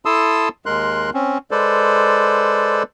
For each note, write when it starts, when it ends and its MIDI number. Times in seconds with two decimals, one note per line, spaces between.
0.05 0.49 64
0.05 0.49 69
0.05 0.49 81
0.05 0.49 84
0.05 0.49 87
0.05 0.49 88
0.66 1.10 39
0.66 1.10 56
0.66 1.10 70
0.66 1.10 84
0.66 1.10 90
1.14 1.38 60
1.14 1.38 61
1.51 2.83 56
1.51 2.83 69
1.51 2.83 71
1.51 2.83 72
1.51 2.83 74